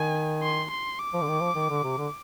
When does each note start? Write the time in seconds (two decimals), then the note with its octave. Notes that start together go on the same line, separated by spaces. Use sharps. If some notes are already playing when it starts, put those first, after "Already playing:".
Already playing: D#3 G#5
0.42 C6
0.71 C6
0.99 D6
1.14 F3
1.22 D3
1.28 D#3
1.41 F3
1.55 D#3
1.70 D3
1.84 C3
1.98 D3